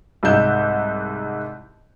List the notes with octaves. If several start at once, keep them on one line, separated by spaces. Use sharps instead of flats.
C2 G#2 D#5 G6 E7